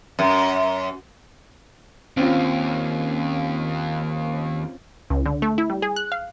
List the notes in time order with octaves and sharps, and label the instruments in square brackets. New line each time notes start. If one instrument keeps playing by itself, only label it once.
[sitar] F#2
[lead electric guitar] D#2 [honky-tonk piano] C4 C#4 F4
[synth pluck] C#2
D3
A3
E4
G3
G#4
F#6
F5